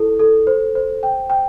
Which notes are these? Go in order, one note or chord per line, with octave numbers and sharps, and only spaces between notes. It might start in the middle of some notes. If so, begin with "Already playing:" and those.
Already playing: E4 A4
A4
C5
C5
G5
G5